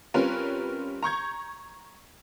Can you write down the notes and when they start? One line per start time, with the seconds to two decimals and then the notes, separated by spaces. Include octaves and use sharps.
0.14 G3 C4 C#4 F4 A#4 B4
1.03 A#5 C#6 G6 G#6